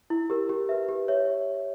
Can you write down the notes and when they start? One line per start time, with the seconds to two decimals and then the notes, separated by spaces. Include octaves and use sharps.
0.10 E4
0.30 G4 A#4
0.49 G4
0.69 B4 E5
0.89 G4
1.08 C#5 E5